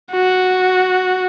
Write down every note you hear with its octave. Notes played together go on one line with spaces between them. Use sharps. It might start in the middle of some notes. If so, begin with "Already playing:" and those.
F#4